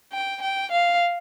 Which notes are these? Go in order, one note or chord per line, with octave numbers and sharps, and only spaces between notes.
G5
G5
F5